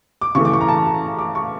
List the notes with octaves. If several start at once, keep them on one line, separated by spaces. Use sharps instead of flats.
D6
C#3 E3 A3 C#6
D6
C#6
A#5
A5
D6
C#6